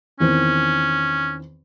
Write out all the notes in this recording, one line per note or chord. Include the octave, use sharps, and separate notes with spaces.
E2 D#3 C4 C#4